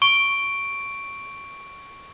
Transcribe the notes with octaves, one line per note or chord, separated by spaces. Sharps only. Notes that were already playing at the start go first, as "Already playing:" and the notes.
C#6 D7